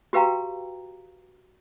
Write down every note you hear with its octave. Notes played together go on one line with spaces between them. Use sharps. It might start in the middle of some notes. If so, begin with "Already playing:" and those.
F#4 G4 B4 F5 G5 A#5